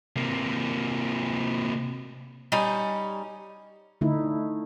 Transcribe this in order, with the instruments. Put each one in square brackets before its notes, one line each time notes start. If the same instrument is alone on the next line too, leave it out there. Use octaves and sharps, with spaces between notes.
[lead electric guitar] C3 A#3
[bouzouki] G3 C#4 D#4 G#5
[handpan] D3 A3 D#4 E4